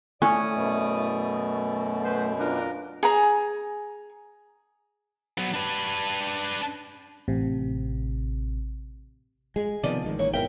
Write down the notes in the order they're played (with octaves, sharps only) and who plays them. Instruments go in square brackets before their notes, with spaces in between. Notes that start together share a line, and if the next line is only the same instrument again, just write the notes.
[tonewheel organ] A3 [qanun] C#4 [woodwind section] E4 D5 D#6
[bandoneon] F#2 B2
[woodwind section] B3 B4 C5
[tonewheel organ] D4 [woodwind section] F4 A#4
[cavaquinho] G#4 G#5 A#5
[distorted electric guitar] F#3 B3
D4 B4
[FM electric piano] A1 C3
[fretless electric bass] G#3 [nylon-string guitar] G#4
[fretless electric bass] C3 D#3 B3 [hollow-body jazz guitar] F3 D5 D#5
[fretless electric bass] A1 D#3 G#3
[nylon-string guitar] E3 A#3 C#5
[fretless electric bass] G#1 B2 [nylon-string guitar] E4 A#4 E5 [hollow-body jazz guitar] G5